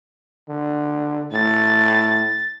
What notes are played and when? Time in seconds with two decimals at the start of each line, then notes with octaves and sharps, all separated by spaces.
0.49 D3
1.32 A2 A6